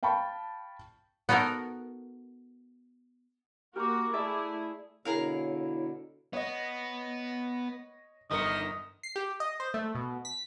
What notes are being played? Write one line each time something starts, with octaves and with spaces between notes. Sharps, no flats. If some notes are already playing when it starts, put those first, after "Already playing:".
F5 G5 A5 B5 C#6
B3 D#4 F#4 A4 A#4
A#3 F#4 G4 A#4 A#5 D6 F6
A3 E4 G#4 D5 E5 A5
B2 D3 E4 G#4 A#4 C#5 F5
B3 C#5 D#5
G1 D#3 A#4 D#5 C#7
C7
G4
D#5
C5
A3
B2
B6